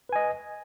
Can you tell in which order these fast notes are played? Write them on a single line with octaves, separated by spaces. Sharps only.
B4 G#5 D#5